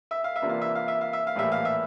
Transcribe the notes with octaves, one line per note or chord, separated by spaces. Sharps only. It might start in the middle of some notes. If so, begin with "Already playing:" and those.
E5
F5
E5
C3 E3 A#3 D4 F4
F5
E5
F5
E5
F5
E5
F5
A#1 A2 E3 G3 A#3 E5
F5
E5